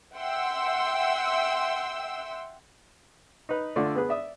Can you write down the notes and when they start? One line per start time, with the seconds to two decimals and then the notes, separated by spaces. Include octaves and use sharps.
0.14 E5 F#5 G5 C6 E6
3.49 D#4 B4
3.76 D3 A3 F4 D5
3.95 B3 G#4 B4
4.09 D5 E5 D#6